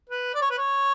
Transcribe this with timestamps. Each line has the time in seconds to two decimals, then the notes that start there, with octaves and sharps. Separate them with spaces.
0.09 B4
0.34 D5
0.42 C#5
0.50 B4
0.58 C#5